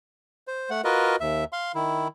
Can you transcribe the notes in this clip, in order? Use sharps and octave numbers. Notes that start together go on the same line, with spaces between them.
C5
A3 F#5
F4 F#4 A#4 B4 D#5
D#2 E5
F5 C6
D#3 E4